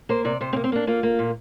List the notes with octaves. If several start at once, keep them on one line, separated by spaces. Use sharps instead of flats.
A#3 C5
C3 D5
C3 C5
C4
A#3
C4
A#3 D4
A#3 F4
A#3
A#2